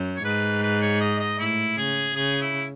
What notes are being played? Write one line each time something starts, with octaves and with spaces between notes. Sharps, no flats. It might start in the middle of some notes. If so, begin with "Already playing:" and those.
Already playing: F#2
C#5
G#2 B4
B4
C#5
D#5
D#5
A2 E4
C#3 G#4
C#3 G#4
E4